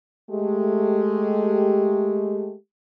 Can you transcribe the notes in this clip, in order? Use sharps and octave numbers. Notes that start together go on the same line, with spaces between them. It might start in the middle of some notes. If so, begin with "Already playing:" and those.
G#3 A3 G4